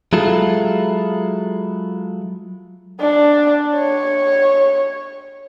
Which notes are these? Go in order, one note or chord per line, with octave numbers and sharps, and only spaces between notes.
F#3 G#3 E4 F4 A4
D4
C#5